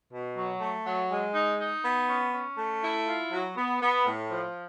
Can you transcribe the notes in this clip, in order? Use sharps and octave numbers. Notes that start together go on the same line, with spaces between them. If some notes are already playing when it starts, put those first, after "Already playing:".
B2
F#3
A3
F#3
G#3
D#4
D#4
B3
C#4
C#4
A3
E4
F4
F#3
B3
B3
A2
F3